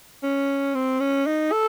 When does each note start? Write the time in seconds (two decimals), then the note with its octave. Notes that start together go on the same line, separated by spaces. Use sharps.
0.23 C#4
0.75 C4
1.00 C#4
1.27 D#4
1.52 A4